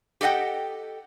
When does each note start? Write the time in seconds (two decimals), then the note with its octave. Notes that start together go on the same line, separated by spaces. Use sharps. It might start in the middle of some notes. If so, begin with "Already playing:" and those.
0.21 G4 A4 D#5 F#5 G5